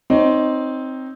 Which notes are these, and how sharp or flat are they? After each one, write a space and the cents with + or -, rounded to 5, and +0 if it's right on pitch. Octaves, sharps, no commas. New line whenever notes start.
C4 +0 D#4 +0 C#5 +20